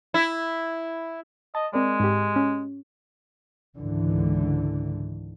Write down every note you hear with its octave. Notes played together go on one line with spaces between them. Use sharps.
E4
D#5 A5
G#3 C4 A#4 D5
G#2 G4
C#4
C#2 G#2 D3 E3